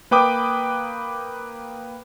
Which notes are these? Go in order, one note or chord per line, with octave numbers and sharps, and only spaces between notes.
A#3 B4 G5 D6 D#6